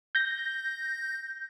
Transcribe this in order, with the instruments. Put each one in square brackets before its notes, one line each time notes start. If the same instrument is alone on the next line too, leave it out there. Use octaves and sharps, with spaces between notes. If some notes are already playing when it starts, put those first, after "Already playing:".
[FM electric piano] G6 A#6